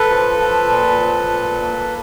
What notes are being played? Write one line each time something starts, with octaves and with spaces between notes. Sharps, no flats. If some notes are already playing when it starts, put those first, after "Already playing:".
Already playing: A4 B4
F3
F3
A#2
F3
A#2
A#3